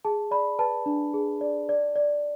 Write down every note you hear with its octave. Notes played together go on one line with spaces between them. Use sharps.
G#4 A5
D5 B5
B4 A5
D4
G#4
D5
D5
D5